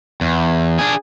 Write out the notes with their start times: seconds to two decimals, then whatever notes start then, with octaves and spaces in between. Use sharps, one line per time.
0.21 E2
0.79 D4 G#4